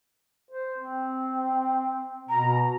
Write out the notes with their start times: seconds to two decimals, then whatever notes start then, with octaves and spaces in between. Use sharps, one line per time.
0.51 C5
0.78 C4
2.29 B2 A#5